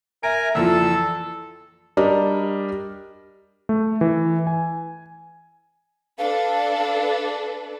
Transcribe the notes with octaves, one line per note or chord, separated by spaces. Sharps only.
A#4 E5 G#5 A#5 D7
A#1 F2 E3 F4 A4 E6
G3 D4 A#4 D#5
A3
E3
G#5
D4 A4 B4 F5